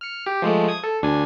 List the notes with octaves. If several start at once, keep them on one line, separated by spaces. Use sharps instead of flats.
F6 C#7
G4
F3 G#3 A3
D#6 G#6
A4
D2 D4 G#5